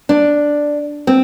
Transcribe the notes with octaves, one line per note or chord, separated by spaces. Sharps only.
D4
C4